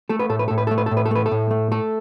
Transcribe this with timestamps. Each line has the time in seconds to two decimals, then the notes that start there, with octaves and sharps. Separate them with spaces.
0.09 A3 A4
0.19 B4
0.29 A2 A4
0.39 B4
0.48 A2 A4
0.58 B4
0.67 A3 A4
0.78 B4
0.86 A4
0.91 A2
0.97 B4
1.06 A4
1.11 A3 B4
1.26 A4
1.31 A2
1.51 A3
1.71 A3 A4